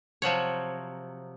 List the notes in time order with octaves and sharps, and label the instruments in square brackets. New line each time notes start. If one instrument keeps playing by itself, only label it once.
[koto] C3 F3 F#3 C#5